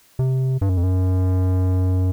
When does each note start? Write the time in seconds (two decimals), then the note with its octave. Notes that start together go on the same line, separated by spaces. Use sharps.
0.19 C3
0.61 G2
0.69 F#2
0.77 F2
0.83 F#2